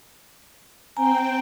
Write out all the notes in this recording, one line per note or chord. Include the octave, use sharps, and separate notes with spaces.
C4 G5 G#5 A#5